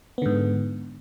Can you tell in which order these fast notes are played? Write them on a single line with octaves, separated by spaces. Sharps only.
B3 D3 G#2